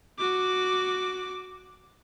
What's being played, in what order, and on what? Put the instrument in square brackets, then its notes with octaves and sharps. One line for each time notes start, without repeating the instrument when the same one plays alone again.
[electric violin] F#4 D6